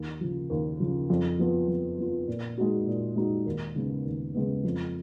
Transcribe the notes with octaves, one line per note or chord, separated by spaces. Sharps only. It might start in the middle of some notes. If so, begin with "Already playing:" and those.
Already playing: D#2
C#3 F3
D#2
C#3 F3
F2
F3 B3 F4
F2
F3 B3 F4
A#2
G#3 D#4 F#4
A#2
G#3 D#4 F#4
D#2
C#3 G#3 B3
D#2
C#3 G#3 B3
F2